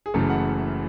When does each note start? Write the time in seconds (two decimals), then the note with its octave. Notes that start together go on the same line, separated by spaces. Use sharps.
0.06 G#4
0.14 F#1 F#2 C#3 E3 A3 A4
0.30 F#5